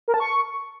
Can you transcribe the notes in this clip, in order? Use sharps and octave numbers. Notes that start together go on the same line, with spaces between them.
A#4
A5
C#6